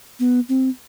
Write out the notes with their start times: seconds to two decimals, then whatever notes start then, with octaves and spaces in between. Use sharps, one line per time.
0.20 B3
0.49 C4